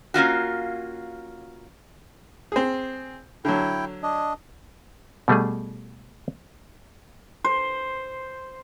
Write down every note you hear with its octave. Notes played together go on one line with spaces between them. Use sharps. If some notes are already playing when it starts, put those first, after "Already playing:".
A#3 C#4 F4 F#4
C4 G#4
D3 F#3 E4 G5
D4 D#5
B2 G3 A3 G#4
C5